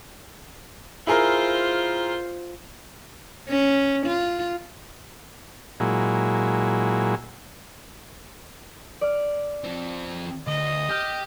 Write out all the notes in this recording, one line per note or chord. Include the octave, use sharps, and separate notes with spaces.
E4 F4 G#4 A#4 C5
C#4
F4
A#2 F#3 G#3 E4
D5 F6
F3 C4
D2 D#5
G4 G5 F6 G6